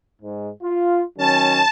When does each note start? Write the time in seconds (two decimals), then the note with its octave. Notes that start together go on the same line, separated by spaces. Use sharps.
0.22 G#2
0.63 F4
1.18 D#3 F#3 C#4 A5